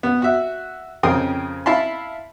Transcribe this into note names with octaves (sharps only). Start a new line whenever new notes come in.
B3
F#4 E5
F2 C#3 A#4 G5 C6 D#6
E4 F5 A5 B5 C6